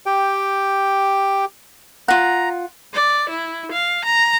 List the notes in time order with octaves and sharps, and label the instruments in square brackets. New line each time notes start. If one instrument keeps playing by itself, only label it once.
[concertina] G4 G5
[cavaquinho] F4 F#5 [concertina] A#5
[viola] D5
E4
F5
A#5